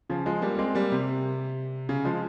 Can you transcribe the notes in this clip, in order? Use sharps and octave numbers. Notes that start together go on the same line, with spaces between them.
C#3 F3
F3 G#3
G3 A#3
A#3
G#3 C4
G3 A#3
C3
C#3
F3 G#3